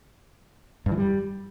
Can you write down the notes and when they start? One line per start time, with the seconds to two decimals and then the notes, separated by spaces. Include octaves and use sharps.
0.86 G2
0.92 E3
0.98 G3